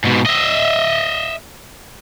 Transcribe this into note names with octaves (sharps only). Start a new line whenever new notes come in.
G#2 B2
D#5 E5